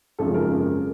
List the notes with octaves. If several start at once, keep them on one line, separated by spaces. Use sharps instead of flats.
G#1 F#2 C#3 F3 G#3 A4
A#4